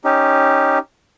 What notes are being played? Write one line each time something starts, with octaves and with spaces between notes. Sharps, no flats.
C#4 D#4 G4